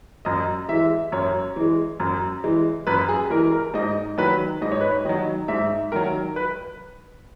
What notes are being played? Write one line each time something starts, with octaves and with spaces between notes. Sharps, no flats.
F#2 D#5
E3 G#3 E5
F#2 C#5
E3 G#3
F#2
E3 G#3
F#2 B4
G#4
E3 G#3 A#4
A#4
G#2 D#5
D#3 F#3 B4
G#2 D#5
C#5
B4
C#5
D#3 F#3 D#5
G#2 E5
D#3 F#3 A#4
B4